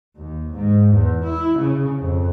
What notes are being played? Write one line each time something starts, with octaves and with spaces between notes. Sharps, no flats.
D#2
G#2
E2
E4
C#3
F2